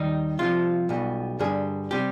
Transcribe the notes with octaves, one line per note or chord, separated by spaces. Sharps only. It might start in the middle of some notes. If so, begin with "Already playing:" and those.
Already playing: D#2 D#3 G3 D#4
C2 C3 F3 F4
B1 B2 G3
G2 D3 G3 G#4
C3 G3 G4